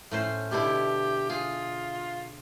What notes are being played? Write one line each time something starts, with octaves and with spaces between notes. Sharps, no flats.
A2 C#4 C5
B2 D3 E4 G4
F4 G#4